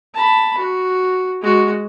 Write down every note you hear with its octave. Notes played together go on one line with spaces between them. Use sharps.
A5 B5
F#4
G#3 F#4